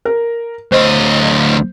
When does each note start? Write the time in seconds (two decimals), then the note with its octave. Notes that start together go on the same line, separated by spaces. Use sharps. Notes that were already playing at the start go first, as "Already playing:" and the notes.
0.05 A#4
0.72 D2 C5 D#5